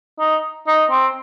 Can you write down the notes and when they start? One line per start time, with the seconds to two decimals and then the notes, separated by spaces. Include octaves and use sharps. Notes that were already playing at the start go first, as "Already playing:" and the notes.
0.19 D#4
0.67 D#4
0.90 C4